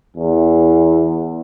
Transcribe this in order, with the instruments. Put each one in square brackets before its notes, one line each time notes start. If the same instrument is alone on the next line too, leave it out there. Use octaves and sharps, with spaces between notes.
[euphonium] E2